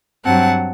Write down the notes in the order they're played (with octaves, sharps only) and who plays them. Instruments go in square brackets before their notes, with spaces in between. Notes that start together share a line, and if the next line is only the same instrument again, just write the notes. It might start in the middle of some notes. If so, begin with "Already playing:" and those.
[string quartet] G2 F#3 C4 F#5 A5